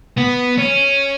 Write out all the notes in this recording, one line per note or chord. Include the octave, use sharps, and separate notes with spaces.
B3
C#4